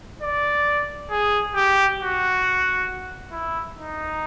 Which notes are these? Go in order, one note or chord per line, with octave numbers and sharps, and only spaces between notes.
D5
G#4
G4
F#4
E4
D#4